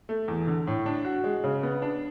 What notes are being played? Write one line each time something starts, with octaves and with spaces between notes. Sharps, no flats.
A3
E2
D3
A2
D4
F#4
G#3
C#3
B3
D4